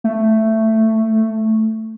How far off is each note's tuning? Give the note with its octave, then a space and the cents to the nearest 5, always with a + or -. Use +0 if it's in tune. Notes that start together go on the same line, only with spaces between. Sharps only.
A3 +10